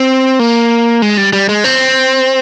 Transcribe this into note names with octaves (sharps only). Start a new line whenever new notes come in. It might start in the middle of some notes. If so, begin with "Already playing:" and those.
Already playing: C4
A#3
G#3
G3
G3
G#3
C4